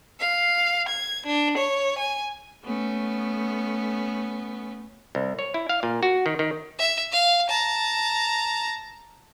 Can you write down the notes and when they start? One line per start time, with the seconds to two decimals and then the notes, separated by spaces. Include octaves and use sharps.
0.20 F5
0.89 G#6
1.26 D4
1.57 C#5
1.99 G#5
2.62 A3 B3 C#4
5.15 C2
5.39 C#5
5.54 E4
5.69 F5
5.83 A#2
6.03 F#4
6.26 D#3
6.39 D#3
6.79 E5
7.12 F5
7.50 A5 A#5